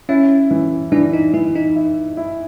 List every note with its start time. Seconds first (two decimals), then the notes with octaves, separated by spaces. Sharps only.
0.09 C#4 E4
0.51 E3
0.92 E3 D4
1.13 D#4
1.33 E3 E4
1.55 D#4
1.76 E4
2.17 E4